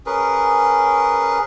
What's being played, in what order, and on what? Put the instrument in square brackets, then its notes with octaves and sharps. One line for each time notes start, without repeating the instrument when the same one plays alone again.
[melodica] C#4 G#4 A#4 B4